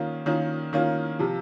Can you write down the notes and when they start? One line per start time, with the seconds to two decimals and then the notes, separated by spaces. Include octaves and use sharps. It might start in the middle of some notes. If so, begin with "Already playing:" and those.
Already playing: D#3 A#3 C#4 F4
0.26 D#3 A#3 C#4 F4
0.73 D#3 A#3 C#4 F4
1.19 C3 F3